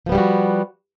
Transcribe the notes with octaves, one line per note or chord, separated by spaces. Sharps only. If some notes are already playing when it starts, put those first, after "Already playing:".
F3 G3 B3 F#4 G4